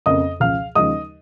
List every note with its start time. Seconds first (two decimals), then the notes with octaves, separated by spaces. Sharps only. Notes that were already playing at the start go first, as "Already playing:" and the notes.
0.06 F2 C#3 A#3 D#5 D#6
0.40 C#2 C#3 F3 F5 F6
0.75 D#2 C#3 F3 G#3 D#5 D#6